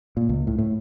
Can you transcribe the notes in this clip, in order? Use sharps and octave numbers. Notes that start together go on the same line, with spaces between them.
A#2
C#2
A2
A2